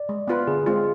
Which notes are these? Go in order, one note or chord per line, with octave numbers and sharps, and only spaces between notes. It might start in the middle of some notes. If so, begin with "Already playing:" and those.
Already playing: D5
G#3
B3 F4 B4
D3 G#4
G#3 C4 F4